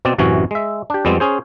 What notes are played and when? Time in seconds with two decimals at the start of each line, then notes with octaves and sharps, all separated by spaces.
0.05 B2 C4 D5
0.18 A1 F#2 C3 E3 F#4 G#5
0.51 G#3 E5
0.90 D4 G4
1.05 F2 G3 G#3 B3 C4
1.20 C#4 G#4 C5